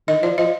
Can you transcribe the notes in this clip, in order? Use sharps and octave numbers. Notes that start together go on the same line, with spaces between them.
D#3 D#5
F3 D5
F3 D#5